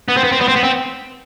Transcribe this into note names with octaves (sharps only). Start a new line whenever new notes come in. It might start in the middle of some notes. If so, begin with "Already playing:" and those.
B3
C4
B3
C4
B3
C4
B3
C4